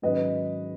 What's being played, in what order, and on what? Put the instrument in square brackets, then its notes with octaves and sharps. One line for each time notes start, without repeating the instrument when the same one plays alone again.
[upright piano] G#2 D#3 F#3 C#4 B4 D#5